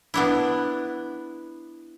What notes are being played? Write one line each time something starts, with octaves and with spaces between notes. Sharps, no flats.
B3 D4 E4